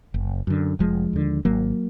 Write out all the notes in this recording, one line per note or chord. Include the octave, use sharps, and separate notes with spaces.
F#1
F#2 D3
F1 F3 G#3
D#2 D3
G#1 F#3 A#3